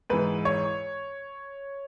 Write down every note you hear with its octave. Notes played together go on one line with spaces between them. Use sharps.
G#2 E3 B4
C#5